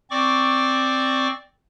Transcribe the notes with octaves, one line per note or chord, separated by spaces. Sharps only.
C4 D5 C#6 D6